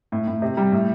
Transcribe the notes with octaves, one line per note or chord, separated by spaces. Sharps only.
A2
A2
C3
G3
A2